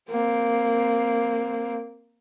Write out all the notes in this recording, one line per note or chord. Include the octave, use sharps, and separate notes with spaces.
A#3 C4